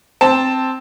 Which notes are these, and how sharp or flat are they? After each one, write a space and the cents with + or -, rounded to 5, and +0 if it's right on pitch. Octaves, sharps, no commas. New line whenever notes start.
C4 +0 A5 +0